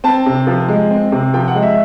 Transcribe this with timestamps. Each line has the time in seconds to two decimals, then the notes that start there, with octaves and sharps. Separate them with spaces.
0.04 C4 A5
0.26 C3
0.47 F3
0.68 G#3
0.91 C4
1.12 C3
1.34 F3 G5
1.48 F#5
1.55 G#3
1.62 E5